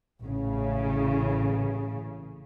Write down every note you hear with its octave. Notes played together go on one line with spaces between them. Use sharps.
A1 C#3